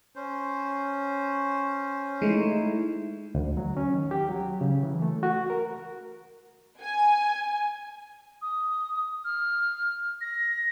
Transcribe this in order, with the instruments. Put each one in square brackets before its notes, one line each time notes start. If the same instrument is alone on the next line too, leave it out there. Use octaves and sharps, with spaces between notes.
[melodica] C#4 C5
[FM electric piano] G#3 A3 [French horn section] D#4 E4
[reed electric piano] D2
F#3
C#4
D#3
G4
F#3
C#3
E3
A3
F#4
A#4
[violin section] G#5
[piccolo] D#6
F6
A#6